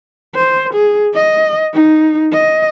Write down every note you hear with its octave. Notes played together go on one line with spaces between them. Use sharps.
C5
G#4
D#5
D#4
D#5